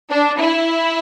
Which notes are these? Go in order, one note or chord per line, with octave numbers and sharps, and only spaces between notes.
D4
E4